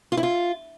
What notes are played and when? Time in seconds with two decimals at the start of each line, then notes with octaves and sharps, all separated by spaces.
0.12 F4
0.17 E4
0.23 F4